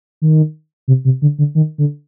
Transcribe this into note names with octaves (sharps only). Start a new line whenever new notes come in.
D#3
C3
C3
D3
D3
D#3
D3